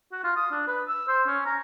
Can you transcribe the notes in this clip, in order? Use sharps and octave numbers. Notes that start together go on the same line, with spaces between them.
F#4
F4
D#6
D4
B4
E6
C5
C#4
A#5